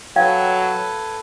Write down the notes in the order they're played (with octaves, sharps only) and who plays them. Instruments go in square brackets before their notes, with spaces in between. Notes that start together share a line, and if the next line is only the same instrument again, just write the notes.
[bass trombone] F#3 [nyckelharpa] A4 B4 [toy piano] F5 G5 [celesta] G#6